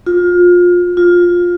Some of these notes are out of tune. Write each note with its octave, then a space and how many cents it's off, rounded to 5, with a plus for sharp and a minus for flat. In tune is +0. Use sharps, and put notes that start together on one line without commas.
F4 +25
F4 +15